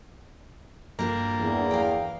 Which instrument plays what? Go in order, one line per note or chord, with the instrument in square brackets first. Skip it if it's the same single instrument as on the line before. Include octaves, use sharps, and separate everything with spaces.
[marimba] G2 [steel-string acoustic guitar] G3 D4 A#4 [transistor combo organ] A#3
[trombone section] E2
[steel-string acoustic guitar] F5 G5